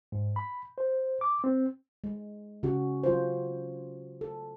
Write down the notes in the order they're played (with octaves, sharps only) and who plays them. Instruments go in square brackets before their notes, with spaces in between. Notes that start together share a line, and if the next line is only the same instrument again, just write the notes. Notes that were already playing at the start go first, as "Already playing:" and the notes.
[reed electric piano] G#2
B5
C5
D6
C4
[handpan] G#3
C#3 C#4 F#4
F#3 F4 C5
A4